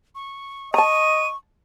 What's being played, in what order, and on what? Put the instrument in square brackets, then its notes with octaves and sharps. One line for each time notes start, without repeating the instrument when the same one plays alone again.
[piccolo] C#6
[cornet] D#5 [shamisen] A5 A#5 [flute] C#6 [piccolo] D#7